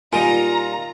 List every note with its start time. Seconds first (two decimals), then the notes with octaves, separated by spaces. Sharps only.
0.13 A#2 G3 D#4 F4 G#5 A#5